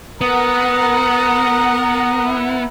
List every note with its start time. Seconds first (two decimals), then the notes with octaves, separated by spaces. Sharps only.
0.21 B3 A#4 F#5 A#5 D#6
2.24 E4